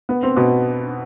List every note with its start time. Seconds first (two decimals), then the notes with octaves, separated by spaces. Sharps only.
0.09 B3
0.23 C4
0.36 B2 B3